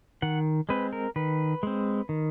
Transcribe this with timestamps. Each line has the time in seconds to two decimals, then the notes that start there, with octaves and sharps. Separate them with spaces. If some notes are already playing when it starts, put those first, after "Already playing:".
0.22 D#3 F#5
0.69 G#3 C4 B4
0.93 A#4
1.16 D#3 B4
1.63 G#3 C4
2.09 D#3